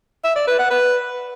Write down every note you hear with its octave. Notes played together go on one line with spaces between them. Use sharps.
E5
D5
B4
F#5
B4